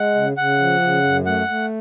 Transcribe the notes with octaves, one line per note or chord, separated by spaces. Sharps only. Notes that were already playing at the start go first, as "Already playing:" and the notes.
Already playing: G#3 F#5
C#3
C#3 F#5
F3
C#3
F#2
A3 F#5
A3